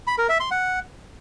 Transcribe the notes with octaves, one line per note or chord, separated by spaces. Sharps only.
B5
A#4
E5
C6
F#5